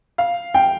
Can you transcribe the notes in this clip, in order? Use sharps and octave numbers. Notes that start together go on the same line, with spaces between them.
F5
G5